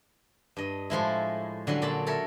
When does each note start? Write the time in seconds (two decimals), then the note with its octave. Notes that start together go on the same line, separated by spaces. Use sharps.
0.57 G2 D#5
0.90 A2 F3 G#3 E4
1.67 D3 F#3 G3 C#4
1.82 A#2 F#3 D5 A5 B5
2.06 A4 A#4 C#5 E5